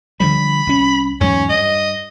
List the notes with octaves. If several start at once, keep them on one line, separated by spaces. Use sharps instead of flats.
D3 F3 G3 B5
C2 C#4
E2 G#2 F#3 C#4
G2 D#5